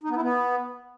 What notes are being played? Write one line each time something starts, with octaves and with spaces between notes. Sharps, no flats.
D#4
B3
E4
B3